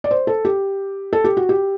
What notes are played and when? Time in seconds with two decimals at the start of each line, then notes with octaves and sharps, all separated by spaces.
0.04 D5
0.11 C5
0.27 A4
0.45 G4
1.13 A4
1.24 G4
1.37 F#4
1.49 G4